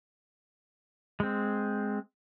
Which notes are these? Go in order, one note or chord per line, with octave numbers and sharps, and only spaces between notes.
G#3 C4